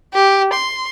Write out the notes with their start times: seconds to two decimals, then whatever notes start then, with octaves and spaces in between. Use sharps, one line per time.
0.14 G4
0.53 C6